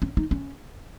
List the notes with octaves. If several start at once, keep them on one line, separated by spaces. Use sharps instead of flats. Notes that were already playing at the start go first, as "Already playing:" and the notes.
C#4
D#4
C#4